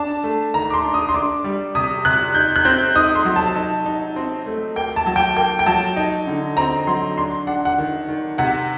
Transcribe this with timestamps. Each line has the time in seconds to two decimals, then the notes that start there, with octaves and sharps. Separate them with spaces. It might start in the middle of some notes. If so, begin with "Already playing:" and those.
Already playing: D4 A5
0.24 A3
0.54 D#3 A#5
0.70 D6
0.74 C6
0.84 D4
0.94 D#6
1.09 C6
1.14 D4 D6
1.44 G3
1.75 C3 D#6
2.05 C3 F#6
2.34 D#4 G6
2.56 F#6
2.65 C4 G6
2.95 D#4 D#6
3.15 C6
3.25 F#3
3.36 A5
3.55 D#4
3.86 D#4
4.16 C4
4.46 A3
4.76 A#3 G5
4.96 A5
5.06 F#3
5.16 G5
5.37 A#3 G5
5.59 G5
5.66 F#3 A5
5.96 D#4
6.27 D3
6.57 C4 A#5
6.87 F#3 C6
7.18 D4 C6
7.47 D4 F#5
7.65 F#5
7.78 D#3
8.09 D#3
8.38 C3 F#5